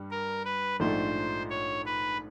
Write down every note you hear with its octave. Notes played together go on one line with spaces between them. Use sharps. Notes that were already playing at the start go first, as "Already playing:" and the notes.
Already playing: G2 G3
A#4
B4
A#1 G#2 F3 A3 D4 C5
C#5
B4